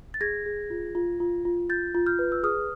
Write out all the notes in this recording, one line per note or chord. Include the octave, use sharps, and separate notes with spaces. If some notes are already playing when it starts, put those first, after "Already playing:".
A6
G#4 G#6 A#6
G#4
F4
F4
F4
F4
F4 G6 A6
F4
F6 G6
B4
E6
G#4 D#6 F6